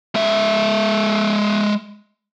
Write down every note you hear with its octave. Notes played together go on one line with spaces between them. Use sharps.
G#3 E5